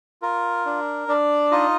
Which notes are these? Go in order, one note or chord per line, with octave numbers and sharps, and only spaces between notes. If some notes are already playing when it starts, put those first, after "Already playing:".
F4 A#4
D4
D4 D5
D#4 F4 D#5